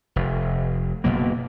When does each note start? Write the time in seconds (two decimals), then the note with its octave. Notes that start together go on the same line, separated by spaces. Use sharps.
0.16 F1
1.04 F#1 B2 F#3 A#3